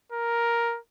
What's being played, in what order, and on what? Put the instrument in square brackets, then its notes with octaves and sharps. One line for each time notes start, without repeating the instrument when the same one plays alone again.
[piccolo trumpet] A#4